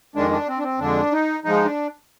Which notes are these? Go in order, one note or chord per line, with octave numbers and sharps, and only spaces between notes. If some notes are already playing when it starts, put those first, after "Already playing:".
F2 D#3 G#3 D4
D4
C4
D4
C4
F2 D3 G#3 D4
D#4
G#2 F3 G#3 D#4
D4